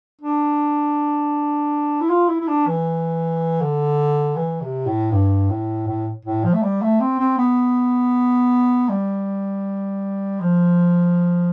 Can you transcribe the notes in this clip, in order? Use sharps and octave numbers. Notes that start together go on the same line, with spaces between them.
D4
E4
F4
E4
E4
D4
E3
D3
E3
C3
A2
G2
A2
A2
A2
F3
A3
G3
A3
C4
C4
B3
G3
F3